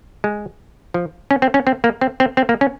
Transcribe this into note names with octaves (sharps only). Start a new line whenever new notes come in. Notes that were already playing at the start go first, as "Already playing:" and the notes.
G#3
F3
C#4
C4
C#4
C4
A#3
C4
C4
C4
A#3
C#4